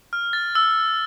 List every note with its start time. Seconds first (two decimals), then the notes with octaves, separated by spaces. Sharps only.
0.13 F6
0.33 A6
0.55 E6